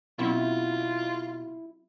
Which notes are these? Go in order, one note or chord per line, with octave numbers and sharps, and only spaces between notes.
B2 F#3 C4 C#4 E4 F4